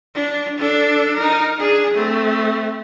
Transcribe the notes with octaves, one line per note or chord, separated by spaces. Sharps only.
D4
D4 A4
D#4 A#4
D4 G#4
A3 C4